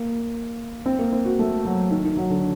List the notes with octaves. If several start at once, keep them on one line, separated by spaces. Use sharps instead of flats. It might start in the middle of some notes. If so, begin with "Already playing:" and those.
Already playing: A#3
C4
A#3
C4
F#4
A3
F#3
D#3
D#3
F#3
D3